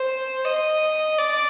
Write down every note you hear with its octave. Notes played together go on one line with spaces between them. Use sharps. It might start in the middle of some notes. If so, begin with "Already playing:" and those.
Already playing: C5
D#5
D5